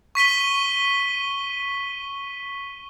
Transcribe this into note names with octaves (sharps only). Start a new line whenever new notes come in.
C#6 B6 D#7 G7